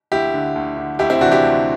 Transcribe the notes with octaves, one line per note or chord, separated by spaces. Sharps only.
D2 E4 G4
D3
D2
D3
D2 E4 G4
C4 E4
C3 E3 D4 F#4
E4 G4
D2